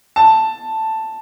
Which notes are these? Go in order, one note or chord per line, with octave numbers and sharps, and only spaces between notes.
A5